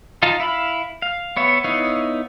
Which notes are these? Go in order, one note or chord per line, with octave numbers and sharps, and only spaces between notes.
D#4 F4 F5 A5
E4 E5 F5 B5
F5
B3 C#5 E5
B3 D#4 E4 C#5 F5